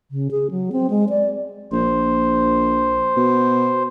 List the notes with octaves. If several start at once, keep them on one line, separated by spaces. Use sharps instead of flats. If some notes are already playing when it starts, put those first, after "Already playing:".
C#3
G#4
F#3
C4
G#3
D5
A#1 C5
B2